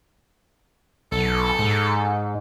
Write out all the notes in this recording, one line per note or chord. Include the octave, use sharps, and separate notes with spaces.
B1 A4
G#2